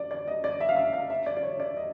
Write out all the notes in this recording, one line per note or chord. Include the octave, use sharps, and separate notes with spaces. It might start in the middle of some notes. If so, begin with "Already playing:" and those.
Already playing: D5
D5
D#5
D5
E5
F5
E5
F5
E5
D5
D5
C#5
D5
D#5